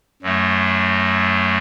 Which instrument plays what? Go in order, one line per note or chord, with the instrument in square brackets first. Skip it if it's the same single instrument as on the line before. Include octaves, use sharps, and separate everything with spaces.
[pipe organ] F#2 F#3 A3